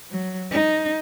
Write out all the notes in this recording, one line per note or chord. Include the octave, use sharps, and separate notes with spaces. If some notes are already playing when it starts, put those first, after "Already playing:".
F#3
D#4